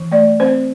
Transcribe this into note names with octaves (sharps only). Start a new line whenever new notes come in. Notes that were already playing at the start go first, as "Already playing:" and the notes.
Already playing: E3
A3 D5
C4 C5